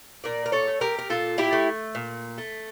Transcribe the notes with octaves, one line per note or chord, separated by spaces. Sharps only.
A#2 A#4 D5
A#4
A4 C#5
A3
G4 A#4
A#4
A#2 F4 A4
E4 G4
A3
A#2
A3